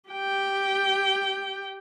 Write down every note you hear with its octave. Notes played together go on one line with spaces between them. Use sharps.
G4 G5